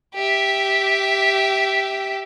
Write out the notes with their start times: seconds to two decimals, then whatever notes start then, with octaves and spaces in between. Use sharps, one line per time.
0.15 G4 E5